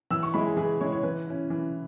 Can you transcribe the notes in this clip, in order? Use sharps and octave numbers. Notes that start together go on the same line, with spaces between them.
E3 E6
C#6
G#3 E4 B5
G#4
E3 G#4
G#3 E4 C#5
C#5
E3 B4
C#4 E4
E3